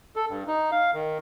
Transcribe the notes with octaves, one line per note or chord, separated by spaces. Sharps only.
A4
G2
D#4
F5
D#3